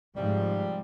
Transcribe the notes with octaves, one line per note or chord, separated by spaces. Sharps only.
G#2 C3 F3 G3